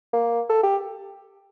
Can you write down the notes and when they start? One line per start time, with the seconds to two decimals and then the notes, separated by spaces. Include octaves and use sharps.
0.13 A#3
0.49 A4
0.63 G4